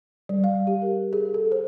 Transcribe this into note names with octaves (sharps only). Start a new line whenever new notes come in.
G3
F5
G4
A#4
G#4
A4
C5